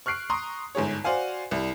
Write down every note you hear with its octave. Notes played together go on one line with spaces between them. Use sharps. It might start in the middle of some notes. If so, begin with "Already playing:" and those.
C#6 F6 F#6 C7 D7
A#5 C6 C#6 D#6
G1 G#2 G#4 C#5
F#4 C5 D5 F5 G#5
C2 G3